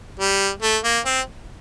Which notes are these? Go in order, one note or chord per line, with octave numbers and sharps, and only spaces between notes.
G3
A3
A#3
C4